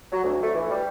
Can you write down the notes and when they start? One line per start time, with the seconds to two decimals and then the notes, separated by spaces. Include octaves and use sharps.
0.12 F#3
0.24 D2
0.43 A3
0.55 E3
0.70 G3